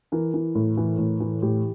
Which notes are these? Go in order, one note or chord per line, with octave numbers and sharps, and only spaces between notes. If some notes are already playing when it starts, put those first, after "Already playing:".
E3 A#4
E3
A2
E3
A2
E3
A2 G4